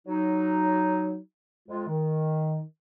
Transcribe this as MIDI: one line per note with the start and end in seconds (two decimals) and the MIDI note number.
0.08 1.17 54
0.08 1.17 63
1.69 1.85 41
1.69 1.85 56
1.69 1.85 65
1.88 2.61 51